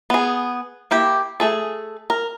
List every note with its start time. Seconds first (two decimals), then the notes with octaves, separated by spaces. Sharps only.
0.10 B3 G#4
0.91 A#3 E4 G4
1.40 A3 G#4 A4
2.10 A#4